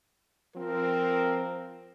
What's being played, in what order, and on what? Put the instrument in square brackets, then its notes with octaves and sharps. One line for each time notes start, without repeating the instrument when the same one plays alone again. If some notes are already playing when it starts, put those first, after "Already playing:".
[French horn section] F3 C4 [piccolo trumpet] A#4